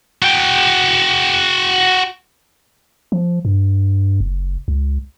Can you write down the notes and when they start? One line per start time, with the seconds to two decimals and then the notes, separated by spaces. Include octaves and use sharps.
0.22 F#4 G5
3.12 F3
3.45 G2
4.20 F#1
4.68 C#2